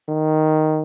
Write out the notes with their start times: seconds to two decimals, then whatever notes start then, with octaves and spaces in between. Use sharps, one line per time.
0.08 D#3